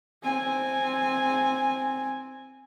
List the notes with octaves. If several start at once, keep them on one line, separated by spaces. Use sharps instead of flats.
C4 G#5